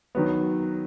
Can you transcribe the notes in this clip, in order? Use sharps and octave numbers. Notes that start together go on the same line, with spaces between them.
D#3 F#3 B3